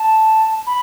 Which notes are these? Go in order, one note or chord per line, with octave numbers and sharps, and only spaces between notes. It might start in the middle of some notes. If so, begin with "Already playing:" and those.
Already playing: A5
B5